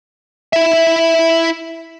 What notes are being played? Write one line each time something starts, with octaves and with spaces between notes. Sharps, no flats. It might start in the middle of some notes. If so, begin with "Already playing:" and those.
E4 E5